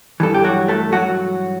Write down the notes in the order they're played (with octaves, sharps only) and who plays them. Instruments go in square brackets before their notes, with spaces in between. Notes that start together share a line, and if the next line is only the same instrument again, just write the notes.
[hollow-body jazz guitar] G2 E3 A4
G4
F#3 F#4
A3 A4
F#3 F#4